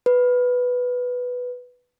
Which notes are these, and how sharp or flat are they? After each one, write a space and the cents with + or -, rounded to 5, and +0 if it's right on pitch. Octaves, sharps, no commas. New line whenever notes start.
B4 +0